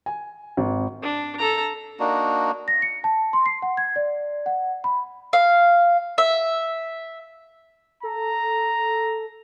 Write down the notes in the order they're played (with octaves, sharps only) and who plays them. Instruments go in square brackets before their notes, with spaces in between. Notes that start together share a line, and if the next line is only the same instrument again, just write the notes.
[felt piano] G#5
G#1
[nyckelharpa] D4
A4 A#5
[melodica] A#3 D4 D#4 F#4
[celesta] A#6
C#7
A5
C6
C7
F#5
G#6
D5
F#5
B5
[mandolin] F5
E5
[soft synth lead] A4 [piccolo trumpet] A#5